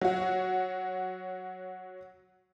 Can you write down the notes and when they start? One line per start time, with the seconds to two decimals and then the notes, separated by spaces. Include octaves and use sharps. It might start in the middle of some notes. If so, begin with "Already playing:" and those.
0.01 F#3 F#4